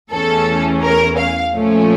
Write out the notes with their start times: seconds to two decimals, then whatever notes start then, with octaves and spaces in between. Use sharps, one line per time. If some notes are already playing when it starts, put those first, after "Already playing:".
0.11 E2 E3 A3 C#4 A4
0.84 A#4
1.19 F5
1.54 A#2 F3 A3 C#4